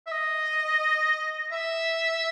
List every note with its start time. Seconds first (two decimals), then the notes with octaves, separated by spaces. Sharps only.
0.06 E5
0.11 D#5
1.52 E5